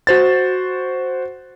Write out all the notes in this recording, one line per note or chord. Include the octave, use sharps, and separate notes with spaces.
F#4 C5 A6